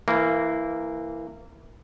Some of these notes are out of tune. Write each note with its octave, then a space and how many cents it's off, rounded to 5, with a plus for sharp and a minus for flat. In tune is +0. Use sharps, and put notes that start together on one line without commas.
E3 +0 A#3 -20